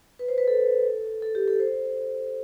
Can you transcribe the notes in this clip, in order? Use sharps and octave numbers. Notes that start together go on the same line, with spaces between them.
B4
C5
B4
A4
A4
G4
A4
C5